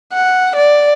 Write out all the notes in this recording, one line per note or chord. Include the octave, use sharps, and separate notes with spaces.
F#5
D5